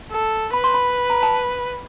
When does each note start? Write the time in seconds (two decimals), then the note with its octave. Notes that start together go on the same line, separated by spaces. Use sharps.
0.11 A4
0.53 B4 B5
0.64 C6
0.74 B5
1.10 A#5
1.23 A5